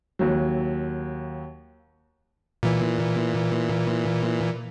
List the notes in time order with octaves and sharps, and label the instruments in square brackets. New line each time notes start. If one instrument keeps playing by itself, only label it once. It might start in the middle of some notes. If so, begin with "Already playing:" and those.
[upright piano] D#2 F#3
[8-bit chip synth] A#2 E3